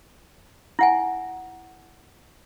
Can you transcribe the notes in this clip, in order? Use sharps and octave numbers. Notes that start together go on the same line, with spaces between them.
E4 F#5 G#5